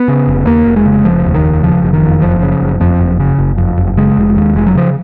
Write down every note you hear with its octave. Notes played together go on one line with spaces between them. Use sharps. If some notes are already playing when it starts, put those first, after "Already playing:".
Already playing: B3
C#3
F1
D#2 A#3
F1
G#3
C#3
F1 F3
D#2
D#3
F1
C#3 F3
F#1
D#3
F2
F#1 F3
C#3
F#1
F2 F3
F#1
C#3
F#1
F2
F#1
C#3 G#3
F1
D#2
F1 G#3
F#3
C#3 F3